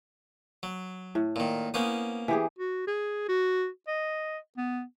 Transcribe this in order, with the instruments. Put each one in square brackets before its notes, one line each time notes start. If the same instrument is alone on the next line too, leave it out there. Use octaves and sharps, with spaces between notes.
[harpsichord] F#3
[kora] A2
[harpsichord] A#2 D#3
[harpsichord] A#3 C#4 D#6 [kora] B3 C5
[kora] E3 G4 G#4
[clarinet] F#4
G#4
F#4
D#5
B3